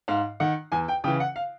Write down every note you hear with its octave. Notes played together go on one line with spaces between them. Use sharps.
G#2 F5
D#3 F#5
E2 G#5
G5
C#3 E3 G5
F#5
F5